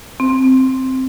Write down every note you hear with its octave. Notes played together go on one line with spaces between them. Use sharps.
C4